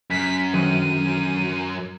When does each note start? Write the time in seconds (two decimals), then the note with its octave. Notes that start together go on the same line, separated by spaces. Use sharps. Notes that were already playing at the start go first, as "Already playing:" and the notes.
0.11 F#2 B6
0.54 D3 D#3 F#3 D#7